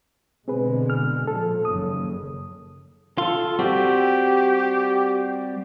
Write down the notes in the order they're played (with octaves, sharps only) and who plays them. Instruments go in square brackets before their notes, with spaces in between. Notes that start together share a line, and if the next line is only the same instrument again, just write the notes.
[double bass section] B2 D3 G#3 [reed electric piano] C4 G#4 B4
[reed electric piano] F6
[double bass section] A#2 F3 [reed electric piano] A4
[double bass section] F#1 D#2 C#3 [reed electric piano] D#6
[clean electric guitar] F4 [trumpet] A4
[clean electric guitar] G3 C4 F#4 [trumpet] G4